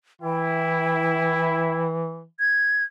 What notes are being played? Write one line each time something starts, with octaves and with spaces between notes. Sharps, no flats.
E3 E4 G5
G#6